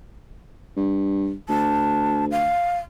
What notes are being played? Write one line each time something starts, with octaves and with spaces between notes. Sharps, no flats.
G2
D2 A5
F5